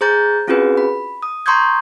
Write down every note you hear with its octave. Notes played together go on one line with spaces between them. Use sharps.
G#4 C5 A#5 G6 A6
C4 C#4 F4 F#4 G#4 B4
B5
D#6
A#5 C6 C#6 D#6 G6 G#6